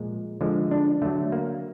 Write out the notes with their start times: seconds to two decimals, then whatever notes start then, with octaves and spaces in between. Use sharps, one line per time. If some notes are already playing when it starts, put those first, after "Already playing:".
Already playing: A#2 F3 G#3
0.41 D3 F3 G#3
0.71 D4
1.02 D3 F#3 A3
1.32 A#3